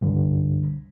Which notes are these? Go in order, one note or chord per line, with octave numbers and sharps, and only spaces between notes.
C2 G2 D3